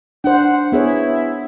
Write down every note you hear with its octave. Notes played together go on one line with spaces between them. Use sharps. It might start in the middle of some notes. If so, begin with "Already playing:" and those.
D4 C5 F#5
B3 E4 G#4 C#5